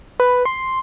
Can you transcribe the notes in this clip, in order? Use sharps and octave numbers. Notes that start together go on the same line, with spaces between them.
B4
C6